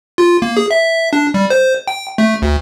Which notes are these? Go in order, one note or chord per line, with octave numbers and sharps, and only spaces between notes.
F4
A#3
G#4
E5
D4
G3
C5
G5
A3
D2